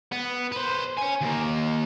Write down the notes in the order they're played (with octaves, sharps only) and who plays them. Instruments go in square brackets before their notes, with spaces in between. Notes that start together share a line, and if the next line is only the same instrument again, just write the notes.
[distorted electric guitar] B3
B4 C5
C#5 G#5
D#2 A#3